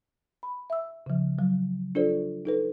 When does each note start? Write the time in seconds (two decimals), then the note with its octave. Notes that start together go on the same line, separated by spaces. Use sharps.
0.43 B5
0.70 E5 E6
1.06 C#3 F3
1.39 F#3
1.95 D4 F4 A4 C5 D5
2.45 D#4 A4 B4